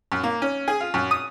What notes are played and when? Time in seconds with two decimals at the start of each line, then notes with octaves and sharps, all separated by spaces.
0.12 F#2
0.23 A#3
0.42 C#4
0.68 G#4
0.80 F4
0.94 F#2
1.11 D#6